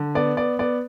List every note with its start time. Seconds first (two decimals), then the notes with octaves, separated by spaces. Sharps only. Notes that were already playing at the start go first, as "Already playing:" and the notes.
Already playing: D3
0.15 B3 D5
0.37 B3 D5
0.59 B3 D5